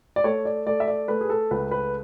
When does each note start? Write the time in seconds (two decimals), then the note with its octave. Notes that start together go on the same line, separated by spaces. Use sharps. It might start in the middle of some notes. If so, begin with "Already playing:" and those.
0.16 D5
0.24 A3 C#5
0.45 D5
0.66 A3 D5
0.80 E5
0.87 D5
1.08 A3 B4
1.21 G#4
1.30 A4
1.51 C#2 B4
1.71 B4